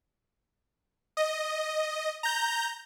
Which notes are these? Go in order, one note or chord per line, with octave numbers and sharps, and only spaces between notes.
D#5
A#5 G6